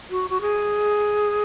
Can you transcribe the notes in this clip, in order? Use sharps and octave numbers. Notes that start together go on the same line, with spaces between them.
F#4
F#4
G#4